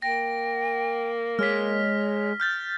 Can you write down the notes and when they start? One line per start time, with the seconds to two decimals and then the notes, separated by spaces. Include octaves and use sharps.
0.02 A#3 G5 A#6
1.39 G#3 C#5 F6 B6
2.40 F6 G6 A6